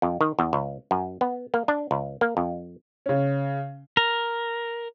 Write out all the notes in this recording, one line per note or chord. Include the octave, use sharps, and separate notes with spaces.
F2
D#3
E2
C#2
F#2
B3
A#3
D4
C#2
A#3
F2
C#3 C#4
A#4